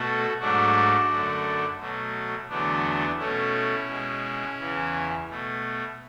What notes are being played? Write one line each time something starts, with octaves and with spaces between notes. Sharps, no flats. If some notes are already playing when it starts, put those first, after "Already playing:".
Already playing: B2 A3 F#4 A4
G#2 F#3 A3 D4 F#4
F#2 D3 A3
B2 F#3 A3
E2 D3 F#3 A3 B3 D4
B2 A3 C#4 E4
B2 G#3
E2 C#3 E3
B2 A3